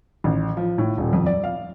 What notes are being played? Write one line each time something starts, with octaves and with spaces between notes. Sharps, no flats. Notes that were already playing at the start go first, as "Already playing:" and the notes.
A1
F3
A2
D#1
F2
D5
F5